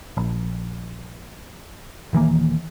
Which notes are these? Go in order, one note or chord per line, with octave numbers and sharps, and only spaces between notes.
A#1
D#1 D#3 E3 A#3